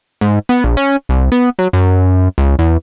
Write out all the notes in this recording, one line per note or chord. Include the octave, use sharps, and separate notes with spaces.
G#2
B3
A#1
C#4
C2
B3
F#3
F#2
C#2
E2